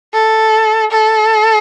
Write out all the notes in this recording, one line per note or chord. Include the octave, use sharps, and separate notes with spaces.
A4
A4